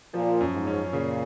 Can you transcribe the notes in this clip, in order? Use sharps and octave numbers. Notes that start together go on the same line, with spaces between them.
A#2 F3
F#2
G#2
C#4
A#2 C#3